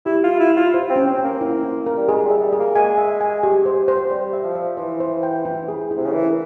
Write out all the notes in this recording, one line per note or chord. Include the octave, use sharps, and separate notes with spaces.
E4 G4
F4 G4
E4
G4
F4
C5
C4
C#4
C4
C#4
A#3
E4
E4
A#4
G3
G#3 G#4
G3
E5
G3
G#4
A#3
G#3 G#5
E5
G#5
G4
C5
C5
G3 C5
E5
F3
E5
E3 C5
C5
G5
E4
G#4
E4
C3
C#3
E3 A#4